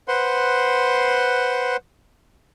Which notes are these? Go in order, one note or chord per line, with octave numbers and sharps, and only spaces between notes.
B4 C5 F#5 C6